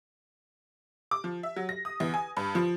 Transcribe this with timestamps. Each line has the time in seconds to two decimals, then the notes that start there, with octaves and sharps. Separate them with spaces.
1.11 D6
1.24 F3
1.43 E5
1.56 F#3
1.69 A#6
1.85 D#6
2.00 E2
2.14 G#5
2.37 G2
2.55 F3